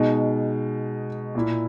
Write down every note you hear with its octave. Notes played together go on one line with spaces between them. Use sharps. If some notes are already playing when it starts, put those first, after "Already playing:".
Already playing: B2 G#3 D#4
A#2 A#3 E4